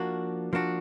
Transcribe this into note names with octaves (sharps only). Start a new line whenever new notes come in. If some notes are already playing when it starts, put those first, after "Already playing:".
Already playing: F3 A#3 D4 F#4
F3 A#3 D4 F#4